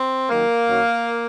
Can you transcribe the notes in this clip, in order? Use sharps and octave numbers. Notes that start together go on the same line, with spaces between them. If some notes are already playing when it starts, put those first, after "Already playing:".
Already playing: C4
F#2 D#3 F#3 A#3
F#2 D#3 F#3